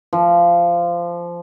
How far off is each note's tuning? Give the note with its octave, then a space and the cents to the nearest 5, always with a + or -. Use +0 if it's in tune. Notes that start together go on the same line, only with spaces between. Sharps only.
F3 -15